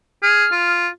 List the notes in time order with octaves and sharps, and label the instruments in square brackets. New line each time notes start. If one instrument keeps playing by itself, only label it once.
[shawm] G#4 [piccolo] F6
[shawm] F4